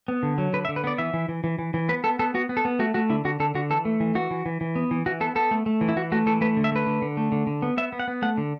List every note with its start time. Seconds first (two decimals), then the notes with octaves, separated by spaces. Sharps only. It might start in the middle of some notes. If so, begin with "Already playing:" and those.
0.08 B3
0.23 D3
0.38 F#3
0.53 D3 B4
0.65 E5
0.69 D3
0.76 B4
0.84 B3 D5
0.98 E3 E5
1.14 E3
1.29 E3
1.44 E3
1.59 E3
1.74 E3
1.89 B3 B4
2.04 B3 A4
2.19 B3 A4
2.34 B3 F#4
2.49 B3
2.57 A4
2.65 B3
2.79 A3 F#4
2.94 A3 F#4
3.10 D3 E4
3.25 D3 F#4
3.40 D3 A4
3.55 D3 F#4
3.70 E3 A4
3.85 A3
4.00 E3
4.15 E3 F#4
4.31 E3
4.46 E3
4.61 E3
4.76 B3
4.91 E3
5.06 E3 F#4
5.21 B3 A4
5.35 B3 A4
5.51 A3
5.66 A3
5.81 E3
5.89 E4
5.96 E3 F#4
6.12 A3 F#4
6.26 E3 A4
6.41 A3 B4
6.57 D3
6.64 E5
6.72 A3 B4
6.87 D3
7.02 D3
7.17 A3
7.32 D3
7.47 D3
7.62 B3
7.77 B3 E5
7.92 B3
8.00 F#5
8.08 B3
8.22 A3 F#5
8.38 D3